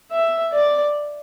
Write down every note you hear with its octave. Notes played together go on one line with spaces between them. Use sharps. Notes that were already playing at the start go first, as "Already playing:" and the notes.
E5
D5